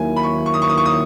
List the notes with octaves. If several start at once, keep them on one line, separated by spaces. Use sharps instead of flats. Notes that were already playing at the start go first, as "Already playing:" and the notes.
Already playing: D#2 D#3 F#3 A#3 E4 G#5
B5
C#6
C#6
D#6
C#6
D#6
C#6
D#6